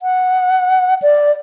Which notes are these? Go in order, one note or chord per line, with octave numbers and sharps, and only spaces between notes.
F#5
D5